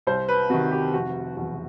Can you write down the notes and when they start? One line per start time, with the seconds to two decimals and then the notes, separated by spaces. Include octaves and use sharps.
0.07 C2 C5
0.29 B4
0.50 C3 D#3 F#4
0.71 G4
0.93 F1 F#4
1.37 E2 B2 F#3 F#4